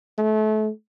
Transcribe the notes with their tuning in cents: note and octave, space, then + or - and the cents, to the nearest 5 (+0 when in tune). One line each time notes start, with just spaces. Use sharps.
A3 -30